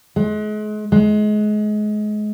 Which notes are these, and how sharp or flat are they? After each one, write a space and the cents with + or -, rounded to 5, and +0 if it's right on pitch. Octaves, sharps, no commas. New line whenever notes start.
G#3 +35
G#3 +30